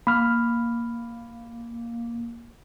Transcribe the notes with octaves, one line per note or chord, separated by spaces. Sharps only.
A#3 B5 F6